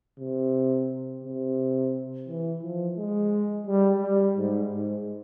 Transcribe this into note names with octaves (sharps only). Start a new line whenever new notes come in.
C3
C3
E3
F3
G#3
G3
G3
G#2
G#2